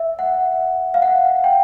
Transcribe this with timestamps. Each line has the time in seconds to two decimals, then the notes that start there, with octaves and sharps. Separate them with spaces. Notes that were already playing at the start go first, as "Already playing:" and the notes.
Already playing: E5
0.19 F#5
0.94 F5
1.02 F#5
1.44 G5